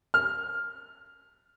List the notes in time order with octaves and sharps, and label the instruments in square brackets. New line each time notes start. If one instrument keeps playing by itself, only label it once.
[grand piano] F6